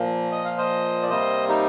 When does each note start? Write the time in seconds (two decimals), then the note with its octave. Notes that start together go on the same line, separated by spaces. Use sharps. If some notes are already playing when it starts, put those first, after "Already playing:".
Already playing: A#2 F3 A#3
0.32 D#5
0.45 F5
0.58 C5 D#5
1.03 D5
1.10 C3 G3 A#3 C5 D#5
1.49 D#4 G4